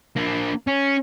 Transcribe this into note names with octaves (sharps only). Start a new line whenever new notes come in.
A#3 D4
C#4